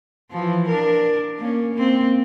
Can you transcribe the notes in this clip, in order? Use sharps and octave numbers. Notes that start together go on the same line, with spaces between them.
E3 F3
D4 A#4
A#3 C#4
A#3 C4